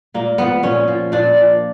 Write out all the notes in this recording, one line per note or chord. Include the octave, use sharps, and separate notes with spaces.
A#2 A#3
F3 B3
A#2 C#4
F3
A#2 D4
F3